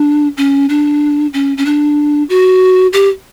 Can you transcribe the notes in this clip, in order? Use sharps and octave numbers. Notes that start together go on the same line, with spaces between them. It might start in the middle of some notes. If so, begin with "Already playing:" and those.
Already playing: D4
C#4
D4
C#4
C#4
D4
F#4
G4